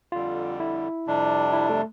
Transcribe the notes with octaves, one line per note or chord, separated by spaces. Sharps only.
F2 D3 G3 F4
E4
F2 C3 G3 D4
E4
A3